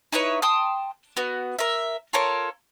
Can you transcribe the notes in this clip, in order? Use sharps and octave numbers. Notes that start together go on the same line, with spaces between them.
D#4 E4 B4 C#5
G5 A5 C6 D#6
B3 F#4
A#4 E5
F4 A4 A#4 C#5